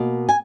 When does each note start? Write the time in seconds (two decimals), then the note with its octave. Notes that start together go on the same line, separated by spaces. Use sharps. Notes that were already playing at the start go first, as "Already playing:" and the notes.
Already playing: B2 A#3
0.29 G#5